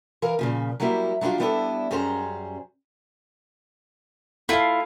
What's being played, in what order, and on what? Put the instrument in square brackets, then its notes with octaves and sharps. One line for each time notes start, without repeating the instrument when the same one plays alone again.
[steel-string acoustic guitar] E3 A#4 F5
A#2 C#3 F3
F#3 G3 A#3 E4 G4
F#3 G3 C#4 D4 F4
G3 B3 D4 E4 G#4 A4
F#2 G3 C#4 G#4 C5 A#5
[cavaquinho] E4 F4 [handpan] A4 F5